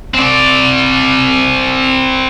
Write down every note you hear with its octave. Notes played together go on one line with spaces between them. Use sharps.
C4 D5